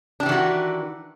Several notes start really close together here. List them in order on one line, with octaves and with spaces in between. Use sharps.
D4 G4 E3 D#3 F#4